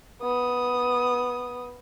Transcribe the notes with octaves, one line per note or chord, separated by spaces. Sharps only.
B3 D#6